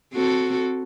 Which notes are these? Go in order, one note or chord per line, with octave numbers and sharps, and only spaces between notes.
C4 F#4 A4